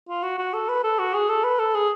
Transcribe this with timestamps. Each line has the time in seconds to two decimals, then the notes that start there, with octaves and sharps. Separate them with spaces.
0.09 F4
0.23 F#4
0.39 F#4
0.54 A4
0.69 B4
0.84 A4
0.99 F#4
1.14 G#4
1.29 A4
1.44 B4
1.59 A4
1.74 G#4